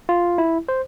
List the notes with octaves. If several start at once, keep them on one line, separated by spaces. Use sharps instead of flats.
F4
E4
C5